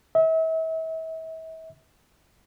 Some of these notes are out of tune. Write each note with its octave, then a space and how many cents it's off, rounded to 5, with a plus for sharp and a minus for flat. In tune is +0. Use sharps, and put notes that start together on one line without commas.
E5 -40